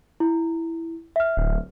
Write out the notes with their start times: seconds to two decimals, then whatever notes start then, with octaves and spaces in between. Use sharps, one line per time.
0.20 E4
1.16 E5 F6
1.37 D1